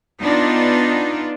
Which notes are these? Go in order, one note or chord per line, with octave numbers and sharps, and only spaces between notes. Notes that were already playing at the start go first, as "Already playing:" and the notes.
B3 D4 D#4 F4